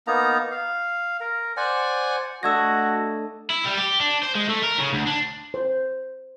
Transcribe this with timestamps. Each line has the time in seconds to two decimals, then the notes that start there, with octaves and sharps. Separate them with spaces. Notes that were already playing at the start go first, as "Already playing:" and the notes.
0.07 A#3 B3 D#4 A#5
0.52 F5
1.20 A#4
1.57 C5 D5 F#5 G#5
2.43 A3 D4 F#4 D#5 E6 G#6 A#6
3.50 E4
3.65 G3
3.77 G4
4.00 D4
4.23 C5
4.35 G#3
4.49 A3
4.63 A#4
4.78 C#3
4.93 D2
5.06 D4
5.54 C5